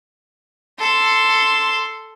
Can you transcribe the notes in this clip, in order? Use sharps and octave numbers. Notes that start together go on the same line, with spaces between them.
A4 C6